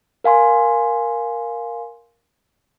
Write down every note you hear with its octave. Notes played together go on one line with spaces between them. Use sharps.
A#4 F5 G#5 C6